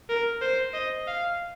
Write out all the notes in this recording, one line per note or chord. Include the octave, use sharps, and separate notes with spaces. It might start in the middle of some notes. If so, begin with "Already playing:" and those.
A#4
C5
D#5
F5